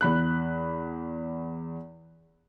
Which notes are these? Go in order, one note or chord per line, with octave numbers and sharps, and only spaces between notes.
E2 B5 F#6